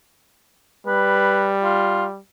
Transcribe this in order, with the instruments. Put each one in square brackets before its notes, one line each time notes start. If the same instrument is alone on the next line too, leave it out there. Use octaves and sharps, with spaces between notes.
[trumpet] G3 [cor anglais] B4
[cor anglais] F4